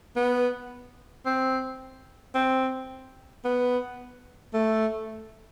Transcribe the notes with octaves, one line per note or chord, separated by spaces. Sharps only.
B3
C4
C4
B3
A3